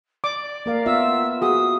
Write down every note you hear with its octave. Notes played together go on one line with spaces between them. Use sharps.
D5 D6
A#3 A#4 F5
B3 F4 E5 E6
F#4 G#4 D#6